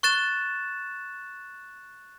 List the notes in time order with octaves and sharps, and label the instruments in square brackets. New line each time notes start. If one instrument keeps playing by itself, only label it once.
[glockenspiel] C#6 F#6 A6 E7